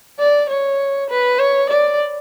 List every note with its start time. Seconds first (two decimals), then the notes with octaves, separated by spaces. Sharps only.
0.19 D5
0.50 C#5
1.10 B4
1.39 C#5
1.70 D5